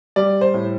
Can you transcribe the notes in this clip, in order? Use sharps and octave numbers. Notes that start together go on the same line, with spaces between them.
G3 D5
C5
A2